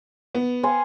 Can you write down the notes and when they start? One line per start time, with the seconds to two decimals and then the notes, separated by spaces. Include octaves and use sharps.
0.35 B3
0.63 F5 G#5 C6